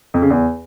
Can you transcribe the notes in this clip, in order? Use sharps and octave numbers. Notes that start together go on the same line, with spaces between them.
F2
C#3
E2